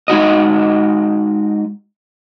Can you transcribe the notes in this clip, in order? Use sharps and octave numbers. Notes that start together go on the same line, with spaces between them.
G#3 D#4 F#4 D#5